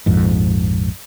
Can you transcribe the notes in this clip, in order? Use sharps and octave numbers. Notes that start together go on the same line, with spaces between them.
A#1 F2 G#2